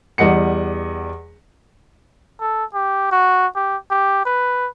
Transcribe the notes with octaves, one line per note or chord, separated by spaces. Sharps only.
E2 G3 D#5 F#5 C#7
A4
G4
F#4
G4
G4
B4